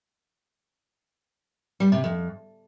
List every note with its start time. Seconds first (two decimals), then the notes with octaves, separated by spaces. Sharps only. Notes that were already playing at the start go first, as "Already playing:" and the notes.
1.80 G3
1.92 C3
2.04 F2